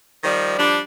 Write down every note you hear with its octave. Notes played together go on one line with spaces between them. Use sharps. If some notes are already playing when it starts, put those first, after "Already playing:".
D#3 F3 G3
F3 G3 D4